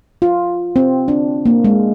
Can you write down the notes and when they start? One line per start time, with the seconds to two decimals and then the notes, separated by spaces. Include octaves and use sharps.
0.22 F4
0.76 C4
1.08 D4
1.46 A#3
1.64 G#3